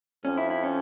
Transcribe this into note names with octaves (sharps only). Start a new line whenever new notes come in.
F2 C#4
E4
E4
C#4